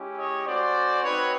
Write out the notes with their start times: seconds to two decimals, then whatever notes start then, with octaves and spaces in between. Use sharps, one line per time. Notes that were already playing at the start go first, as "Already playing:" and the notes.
Already playing: G#3 C#4 E4 G4
0.18 C#5 D#5
0.46 A3 C#4 F#4 C5 D5
1.04 C4 D#4 F#4 B4 C#5